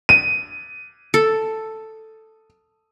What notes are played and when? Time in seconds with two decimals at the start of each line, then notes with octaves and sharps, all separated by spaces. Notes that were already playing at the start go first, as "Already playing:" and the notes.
0.09 D#7
1.14 A4